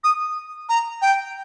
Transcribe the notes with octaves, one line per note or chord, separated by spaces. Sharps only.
D#6
A#5
G5